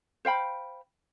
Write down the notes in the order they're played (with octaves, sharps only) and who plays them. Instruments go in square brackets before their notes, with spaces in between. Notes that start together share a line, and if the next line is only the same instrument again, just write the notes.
[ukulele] C5 F5 G5 B5